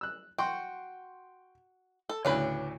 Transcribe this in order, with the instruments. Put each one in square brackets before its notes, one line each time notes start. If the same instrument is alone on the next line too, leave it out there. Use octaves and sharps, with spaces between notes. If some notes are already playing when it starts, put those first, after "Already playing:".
[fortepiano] E6 F#6
[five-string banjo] F#4 [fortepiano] G5 C6 C#6
[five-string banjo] A4
[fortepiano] D2 A2 C#3 [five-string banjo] C#4 D4 B4